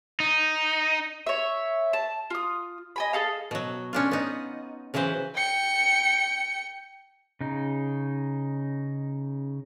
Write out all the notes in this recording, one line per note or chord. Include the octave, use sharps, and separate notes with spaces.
D#4
C#5 E5
A5
F4 D#6
D#5 G#5 B5
G#4 A4 F5
B2 F#3
C#4 D4 F4
B3 D#4
C#3 E3 F#3 B4 C5
G5 C#7
C#3 D#4